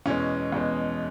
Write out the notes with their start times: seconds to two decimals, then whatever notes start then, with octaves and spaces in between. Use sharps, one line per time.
0.06 E2 B2 G#3 C#4
0.52 E2 B2 G#3